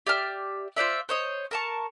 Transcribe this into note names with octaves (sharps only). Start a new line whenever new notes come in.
G4 D5 E5 F6
F4 C5 D5 E5
C5 C#5 D#5
A#4 A5 C#6